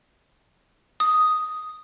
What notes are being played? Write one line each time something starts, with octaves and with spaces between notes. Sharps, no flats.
D#6